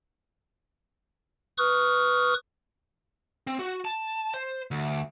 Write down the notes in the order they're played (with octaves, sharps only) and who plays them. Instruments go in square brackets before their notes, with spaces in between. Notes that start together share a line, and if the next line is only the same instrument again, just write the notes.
[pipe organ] B4 C#6 D#6 F6
[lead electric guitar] C4
F#4
A5
C5
D2